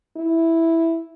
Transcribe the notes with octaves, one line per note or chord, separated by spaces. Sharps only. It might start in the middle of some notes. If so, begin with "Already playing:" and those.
E4